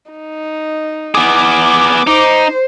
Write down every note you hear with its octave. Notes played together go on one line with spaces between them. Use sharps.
D#4
B3 G#4 D6
D#4 C5